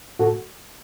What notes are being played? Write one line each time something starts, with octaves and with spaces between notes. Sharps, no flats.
A2 F#4 A4